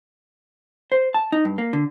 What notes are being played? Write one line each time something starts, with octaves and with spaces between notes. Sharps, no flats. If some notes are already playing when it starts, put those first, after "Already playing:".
C5
A5
D#4
G2
A#3
D3